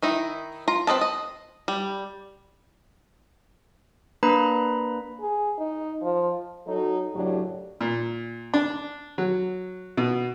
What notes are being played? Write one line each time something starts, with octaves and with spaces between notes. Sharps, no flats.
D#3 D#4 E4
F4 A#5
C4 B4 D#5 A5
D#5
G3
A#3 D4 B4 A#5 B5
G#4
D#4
F3
F#3 D#4 A4
F#2 A2 C#3 F#3 D4 G4
A#2
D4
F#3
B2